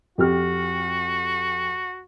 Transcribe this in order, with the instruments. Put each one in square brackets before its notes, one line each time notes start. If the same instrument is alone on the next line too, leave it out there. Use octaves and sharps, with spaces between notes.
[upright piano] F2 G4 F6 [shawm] F#4